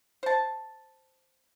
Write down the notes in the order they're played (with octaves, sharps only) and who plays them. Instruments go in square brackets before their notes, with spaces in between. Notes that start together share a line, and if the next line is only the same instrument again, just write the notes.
[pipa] C5 A5